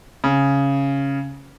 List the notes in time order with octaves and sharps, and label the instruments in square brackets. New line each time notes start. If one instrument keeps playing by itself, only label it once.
[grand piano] C#3